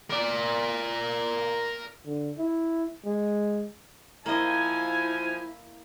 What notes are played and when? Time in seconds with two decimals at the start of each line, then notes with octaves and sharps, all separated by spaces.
0.10 A#4 D5
2.05 D3
2.38 E4
3.05 G#3
4.26 F3 A#3 E4 D#5 G#5